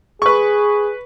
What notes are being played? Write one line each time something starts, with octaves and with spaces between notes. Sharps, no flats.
G#4 B4 C#6